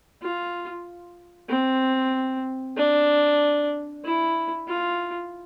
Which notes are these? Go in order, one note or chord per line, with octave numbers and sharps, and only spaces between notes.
F4
C4
D4
E4
F4